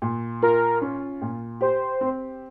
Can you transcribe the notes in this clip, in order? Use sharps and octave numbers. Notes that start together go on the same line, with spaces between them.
A#2
F4 A#4
C#4
A#2
G4 C5
C4